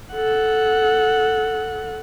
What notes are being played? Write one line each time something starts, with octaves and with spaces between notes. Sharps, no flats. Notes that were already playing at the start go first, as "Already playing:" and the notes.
A4 F#5